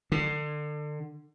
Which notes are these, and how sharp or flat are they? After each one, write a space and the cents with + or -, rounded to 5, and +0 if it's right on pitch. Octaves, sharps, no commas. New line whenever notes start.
D3 +30